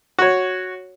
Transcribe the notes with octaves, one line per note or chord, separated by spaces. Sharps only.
F#4 C#5